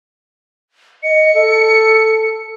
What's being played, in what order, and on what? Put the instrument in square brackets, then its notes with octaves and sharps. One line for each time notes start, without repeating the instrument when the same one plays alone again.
[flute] D#5 [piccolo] C#7
[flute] A4